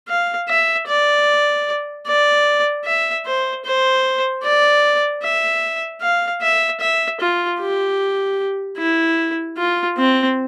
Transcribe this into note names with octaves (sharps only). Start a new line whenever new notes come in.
F5
E5
D5
D5
E5
C5
C5
D5
E5
F5
E5
E5
F4
G4
E4
F4
C4